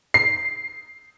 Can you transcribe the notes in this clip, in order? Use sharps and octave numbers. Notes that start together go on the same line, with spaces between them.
C7